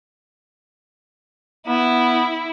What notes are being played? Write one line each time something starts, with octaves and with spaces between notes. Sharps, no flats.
B3 E4